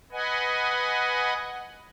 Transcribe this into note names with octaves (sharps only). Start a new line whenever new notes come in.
B4 D#5 F#5 G#5